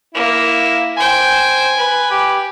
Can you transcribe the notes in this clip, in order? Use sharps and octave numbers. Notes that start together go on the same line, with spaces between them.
A#3 E4
C5 G5 G#5
B4
G4